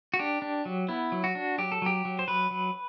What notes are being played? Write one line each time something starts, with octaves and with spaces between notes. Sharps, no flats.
F#4
D4 G4
D4
F#3
B3 E4
F#3
F#4
D4
F#3 G4
A4
F#3 G4
F#3
C5
F#3 B4
F#3